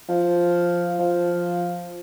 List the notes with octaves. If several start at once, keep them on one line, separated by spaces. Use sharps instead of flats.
F3
F3